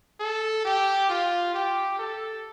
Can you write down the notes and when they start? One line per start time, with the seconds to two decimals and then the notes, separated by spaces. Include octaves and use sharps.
0.20 A4
0.65 G4
1.09 F4
1.54 G4
1.99 A4